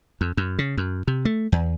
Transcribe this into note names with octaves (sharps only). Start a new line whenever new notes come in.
F2
F#2
C#3
F#2
C3
A3
E2